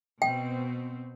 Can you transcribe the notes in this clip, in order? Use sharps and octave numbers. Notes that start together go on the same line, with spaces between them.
B2 C4 G5